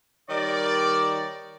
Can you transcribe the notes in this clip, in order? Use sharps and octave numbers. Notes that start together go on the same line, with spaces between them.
D#3 G3 A#4 C#5 D5